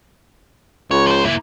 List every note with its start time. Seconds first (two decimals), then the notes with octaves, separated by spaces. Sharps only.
0.91 C#2 C#5
1.06 F3 C5
1.25 A#3 E4